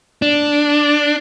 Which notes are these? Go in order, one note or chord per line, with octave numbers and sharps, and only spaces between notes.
D4